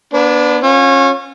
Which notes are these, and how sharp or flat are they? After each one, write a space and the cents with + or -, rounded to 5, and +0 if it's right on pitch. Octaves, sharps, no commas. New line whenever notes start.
B3 -40 D4 +0 B4 +30
C#4 -25 F4 +35